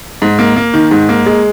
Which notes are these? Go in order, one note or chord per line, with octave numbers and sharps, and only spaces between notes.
G#2
A#3
A#3
D#3
G#2
A#3
G#3